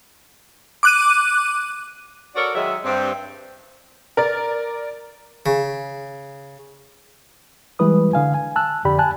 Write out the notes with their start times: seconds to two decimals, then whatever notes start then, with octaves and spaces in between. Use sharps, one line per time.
0.83 D6 F#6 D#7
2.35 F#4 A4 A#4 C#5 D5
2.54 D#3 F#3 G#3 E5
2.84 G2 C4
4.17 A#4 D5 A6
5.46 C#3
7.79 E3 G3 G#3 E4 B4 D#6
8.13 D3 F5 G#5
8.34 G#5
8.56 A5 E6 F#6
8.85 F2 D3 G4 D5 B5
8.98 G#5 A5 F#6